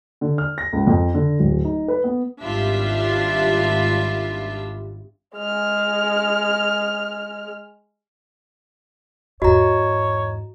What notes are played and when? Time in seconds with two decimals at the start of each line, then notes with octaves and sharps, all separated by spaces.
0.21 D3
0.38 F6
0.58 A#6
0.73 C#2
0.87 F2
1.14 D3
1.40 D1
1.64 D#4
1.88 B4
2.04 B3
2.43 G#1 G3 D4 F4 E5
5.37 G#3 F6
9.42 E2 G#2 F#4 C#5 D#5 A#5